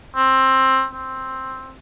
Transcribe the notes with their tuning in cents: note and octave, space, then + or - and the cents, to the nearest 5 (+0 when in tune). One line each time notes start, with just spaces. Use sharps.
C4 +15
C4 +5